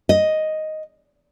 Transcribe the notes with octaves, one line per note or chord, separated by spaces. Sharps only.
D#5